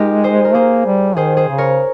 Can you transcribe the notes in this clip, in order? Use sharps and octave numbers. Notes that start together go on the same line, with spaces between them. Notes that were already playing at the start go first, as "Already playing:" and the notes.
Already playing: G#3 D#4 F4 G4 A#4
G#4 C5
A#4
A#3 G#4 C5
G3
D#3 G#4 C5
G#4 C5
C#3
A#4 C#5